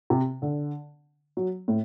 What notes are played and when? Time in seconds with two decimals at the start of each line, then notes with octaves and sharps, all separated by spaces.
0.10 C3
0.42 D3
1.37 F#3
1.68 A2